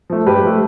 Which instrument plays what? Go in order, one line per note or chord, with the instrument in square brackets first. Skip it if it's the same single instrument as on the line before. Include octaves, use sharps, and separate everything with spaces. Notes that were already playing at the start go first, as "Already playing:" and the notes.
[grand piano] F3 A3
G2 G4 B4
F3 A3